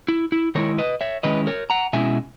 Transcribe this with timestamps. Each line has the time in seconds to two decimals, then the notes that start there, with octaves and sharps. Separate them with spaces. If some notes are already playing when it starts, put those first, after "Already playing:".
0.08 E4
0.32 E4
0.55 D#3 G#3 C#4 E4 A#4 C#5
0.78 B4 D#5
1.01 C#5 E5
1.23 D#3 G#3 C#4 E4 B4 D#5
1.47 A#4 C#5
1.70 F#5 A#5
1.93 B2 G#3 C#4 E4 E5 G#5